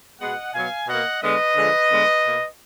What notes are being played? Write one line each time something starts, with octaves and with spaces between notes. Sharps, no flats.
B2 G#3 B3 D#5 F#5
B2 F#3 B3 F5 G#5
B2 A#3 D#5 F#5
D3 G#3 B3 B4 D#5
D3 F3 G#3
D3 G#3 B3
B2 A#3